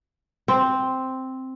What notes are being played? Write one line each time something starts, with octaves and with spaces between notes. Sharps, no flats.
C4